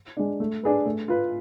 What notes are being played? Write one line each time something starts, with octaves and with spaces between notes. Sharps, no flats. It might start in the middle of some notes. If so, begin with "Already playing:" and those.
G#3 D4
A3
D4 G#4 B4
A3
F4 B4